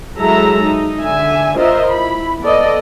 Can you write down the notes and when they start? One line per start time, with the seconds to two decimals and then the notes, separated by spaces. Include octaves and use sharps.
0.19 F#3 G#3 E4 A4 E5 A#5
0.63 D#4
1.02 D3 E5 G#5
1.56 F4 A#4 C5 D#5 E5
1.89 E4 B5
2.42 B3 A4 D5 D#5